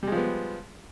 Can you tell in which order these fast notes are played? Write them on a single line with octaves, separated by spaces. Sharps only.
G3 G#3 F3 B3